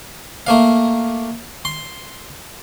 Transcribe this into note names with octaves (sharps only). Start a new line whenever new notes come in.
A3 A#3 F5
C6